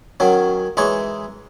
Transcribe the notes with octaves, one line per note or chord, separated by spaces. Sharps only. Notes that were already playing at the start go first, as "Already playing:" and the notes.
D#3 F#3 C#4
E3 G#3 D#4 C#5